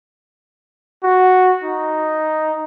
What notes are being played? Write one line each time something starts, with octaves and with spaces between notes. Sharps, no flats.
F#4
D#4